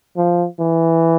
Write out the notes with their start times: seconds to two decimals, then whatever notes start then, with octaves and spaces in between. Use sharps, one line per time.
0.17 F3
0.59 E3